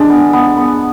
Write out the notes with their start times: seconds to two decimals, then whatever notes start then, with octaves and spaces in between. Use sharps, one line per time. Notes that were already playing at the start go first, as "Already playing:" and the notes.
Already playing: G#3 D4
0.10 B3
0.33 B3
0.57 B3